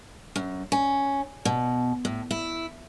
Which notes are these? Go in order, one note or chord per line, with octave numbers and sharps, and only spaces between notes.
F#2
C#4
B2
A2
E4